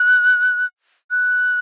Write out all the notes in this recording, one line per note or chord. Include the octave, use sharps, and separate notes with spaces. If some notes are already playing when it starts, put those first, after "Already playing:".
Already playing: F#6
F#6